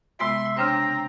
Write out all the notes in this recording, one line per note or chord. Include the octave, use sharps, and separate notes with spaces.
C3 G#3 B3 E5 C6
C#3 C4 D4 C5 A#5